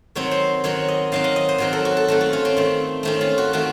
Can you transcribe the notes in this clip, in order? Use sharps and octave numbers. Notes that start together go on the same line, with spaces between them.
D#3 F#3 C4 C#5
C5
D#3 F#3 C4 C#5
D#5
D#3 F#3 C4 F5
D#5
D#5
C5
D#3 F#3 C4 A#4
A4
F#4
A4
D#3 A3 C4 F#4
F4
C#4
C4
D#3 A3 C4
D#3 A3 C4 C#4
F4
F#4
D#3 A3 C4 F#4